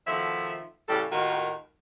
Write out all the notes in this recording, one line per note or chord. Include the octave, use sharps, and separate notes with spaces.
B2 D#3 F3 A3 E5
A2 C#3 G3 A4
D#2 A2 D#3 F4 F#4 A#4